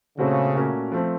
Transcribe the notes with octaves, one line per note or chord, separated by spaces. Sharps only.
A#2 C#3 A3 C4 F#4
A#2 A3 C#4 F#4 A#4
F3 A3 C4